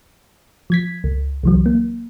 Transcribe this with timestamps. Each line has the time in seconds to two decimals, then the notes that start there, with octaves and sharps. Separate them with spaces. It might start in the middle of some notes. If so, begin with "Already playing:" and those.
0.70 F3 G#6 B6
1.04 C#2
1.43 C2 E3 F#3
1.66 A#3